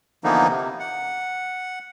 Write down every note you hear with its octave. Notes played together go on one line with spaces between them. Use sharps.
D3 E3 F3 A#3 B3 D#4
C3
F#5